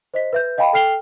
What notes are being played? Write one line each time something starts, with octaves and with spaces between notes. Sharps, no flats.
C5 D#5 B6
B4 E5 G6
D#5 F5 G5 A5 B5
A4 G5 F6 C7 F7 G7